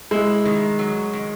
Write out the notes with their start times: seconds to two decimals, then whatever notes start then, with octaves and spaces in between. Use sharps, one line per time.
0.11 G#3 E4
0.45 D#3
0.79 F#3
1.13 D#3